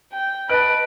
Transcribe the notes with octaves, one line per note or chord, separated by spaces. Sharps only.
G5
B4 D#5 A5 F#6 D7